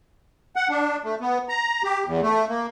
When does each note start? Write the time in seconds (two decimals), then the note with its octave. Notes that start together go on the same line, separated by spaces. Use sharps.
0.56 F#5
0.69 D4
1.04 A3
1.21 B3
1.49 A#5
1.84 G4
2.06 E2
2.22 A3
2.49 A#3